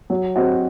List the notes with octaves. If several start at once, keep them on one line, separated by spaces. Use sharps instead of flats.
F#3
C4 F#4 C5 D#5